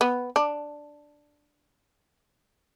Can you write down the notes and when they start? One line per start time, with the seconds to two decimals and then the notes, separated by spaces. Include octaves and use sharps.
0.01 B3
0.36 D4